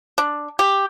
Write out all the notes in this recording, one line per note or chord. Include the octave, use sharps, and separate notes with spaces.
D4
G4